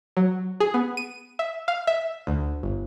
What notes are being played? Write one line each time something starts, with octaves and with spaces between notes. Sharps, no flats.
F#3
G#4
B3
D#7
E5
F5
E5
D2
G1